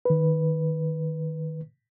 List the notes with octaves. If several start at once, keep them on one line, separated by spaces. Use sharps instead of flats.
D#3 B4